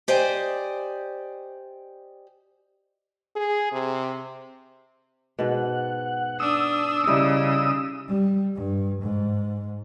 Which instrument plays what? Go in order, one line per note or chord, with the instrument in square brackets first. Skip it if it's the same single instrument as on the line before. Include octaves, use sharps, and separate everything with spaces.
[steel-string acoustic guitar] G4 C5 D5 D#5 G5 G#5
[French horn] G#4
C3
[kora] G#2 B2 [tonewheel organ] F#5
[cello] D4 [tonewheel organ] D#6 E6
[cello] C#3 [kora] G3 D#4 E4
[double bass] G3
G2
G#2